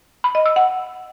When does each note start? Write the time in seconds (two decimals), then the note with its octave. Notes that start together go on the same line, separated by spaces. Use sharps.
0.24 B5
0.35 D#5
0.46 E6
0.56 F#5